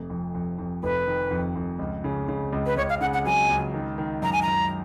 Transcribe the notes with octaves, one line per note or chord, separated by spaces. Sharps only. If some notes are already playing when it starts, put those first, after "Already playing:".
Already playing: F1
F2
F2
F2
F1 B4
D#3
F2
F2
C#2
C#3
C#3
C#2
B4
C#2 C#5
F5
C#3 F#5
F#5
F#3 G#5
C#2
D#3
D#3
F#2 A#5
G#5
F#2 A#5